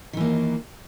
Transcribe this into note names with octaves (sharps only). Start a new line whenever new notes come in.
D#3 E3 A#3